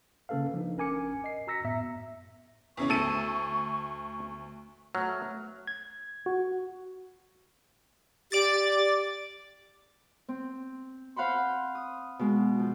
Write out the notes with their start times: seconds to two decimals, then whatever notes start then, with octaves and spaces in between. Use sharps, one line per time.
0.29 C#3 A#3 C#4 A4 B4 F5
0.54 F3 D4 D#4
0.77 G1 C#4 A#4 G#5 D6 C#7
1.24 D#5 C7
1.47 F#4 A#5 E6 A#6 B6 C#7
1.64 F#2 A2 B3 E5 A#5 E6
2.77 E2 C#3 C#4 C#6
2.90 D2 A4 D#7
4.95 F#3 A3 F6
5.67 G#6
6.26 F#4
8.32 G4 D5 D6 A6
10.29 C4
11.16 C5 F5 F#5 B5 C6
11.75 D#6
12.19 B2 G#3
12.59 F3